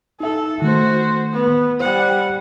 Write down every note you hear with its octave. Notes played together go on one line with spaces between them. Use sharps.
D#4 A4 E5
D#3 A3 F#4 C5
B3
G3 C5 F#5